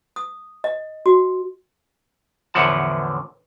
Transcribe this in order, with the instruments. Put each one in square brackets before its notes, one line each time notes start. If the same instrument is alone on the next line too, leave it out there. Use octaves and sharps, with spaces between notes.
[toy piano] D#6
D#5
F#4
[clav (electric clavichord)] E2 A2 D3 F3 F#5 A5